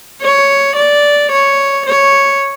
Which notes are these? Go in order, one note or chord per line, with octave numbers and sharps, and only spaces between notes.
C#5
D5
C#5
C#5